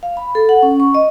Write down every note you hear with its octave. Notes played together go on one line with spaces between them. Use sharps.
F5
B5
A4
F#5
C#4
C#6
D#5